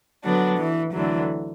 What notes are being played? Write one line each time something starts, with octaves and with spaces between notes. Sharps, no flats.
D3 F#3 B3 D4 F#4
E3
D2 D3 E3 F#3